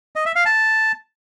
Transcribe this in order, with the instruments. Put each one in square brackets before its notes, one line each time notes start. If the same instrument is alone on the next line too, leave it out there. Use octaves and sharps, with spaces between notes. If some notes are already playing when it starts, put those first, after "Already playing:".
[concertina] D#5
E5
F5
A5